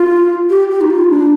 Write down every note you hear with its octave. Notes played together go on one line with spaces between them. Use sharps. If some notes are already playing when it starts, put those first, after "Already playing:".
Already playing: F4
G4
G4
D#4
F4
D4